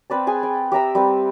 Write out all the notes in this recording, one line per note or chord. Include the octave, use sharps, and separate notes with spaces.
C4 B4 D5 A5
G#4 G#5
G5
G4 E5 A#5 E6
G3 C4 B4